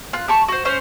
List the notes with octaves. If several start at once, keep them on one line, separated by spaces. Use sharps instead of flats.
F4 F#6
G4 A5 C#6
F#4 C5
C#4 C5